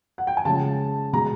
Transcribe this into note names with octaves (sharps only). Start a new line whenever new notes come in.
F#5
G5
G#5
C#3 F3 G#3 A5
B2 G#3 A#5